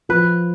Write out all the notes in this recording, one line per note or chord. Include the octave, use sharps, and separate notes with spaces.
F3 B4